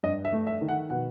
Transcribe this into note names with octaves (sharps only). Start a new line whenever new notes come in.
G2 D#5
E5
A3
E5
D#3
F#5
B2 F#5